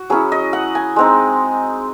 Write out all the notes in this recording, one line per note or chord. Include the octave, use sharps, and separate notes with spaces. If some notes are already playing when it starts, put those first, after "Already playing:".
Already playing: F#4
F#3 C#4 E4 G#4
D#5
F#5
G#5
G#3 C4 D#4